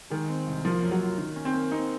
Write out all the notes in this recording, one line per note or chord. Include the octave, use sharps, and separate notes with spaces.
D#3 G#3
C4
C2
F3 A#3
F#2
F#3
F4
D#3
C#4
C4
A#3
C4 D#4